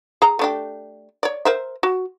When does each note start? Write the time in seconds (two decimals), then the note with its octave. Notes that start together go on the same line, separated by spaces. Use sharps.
0.22 G#4 A#5
0.39 A3 D4 G4
1.23 C#5 D5
1.45 A#4 C5 E5
1.83 F#4